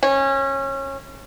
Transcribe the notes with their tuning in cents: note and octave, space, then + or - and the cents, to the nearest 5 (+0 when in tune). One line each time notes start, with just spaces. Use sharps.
C#4 -25